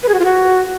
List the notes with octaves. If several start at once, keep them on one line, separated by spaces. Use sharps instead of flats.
B4
G#4
F#4
F4
F#4